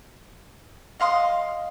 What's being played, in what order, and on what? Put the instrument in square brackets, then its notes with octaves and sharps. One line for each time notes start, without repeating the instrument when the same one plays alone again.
[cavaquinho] D#5 F5 C6 D#6